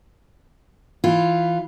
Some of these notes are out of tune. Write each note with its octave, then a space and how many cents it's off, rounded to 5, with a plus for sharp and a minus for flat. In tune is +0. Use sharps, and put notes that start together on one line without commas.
E3 +0 F4 +0